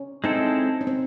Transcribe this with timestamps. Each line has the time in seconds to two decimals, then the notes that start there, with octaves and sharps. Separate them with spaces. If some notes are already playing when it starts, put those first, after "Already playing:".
Already playing: C#4
0.24 G#3 C4 D#4 E4 A4
0.81 C#4
0.87 C4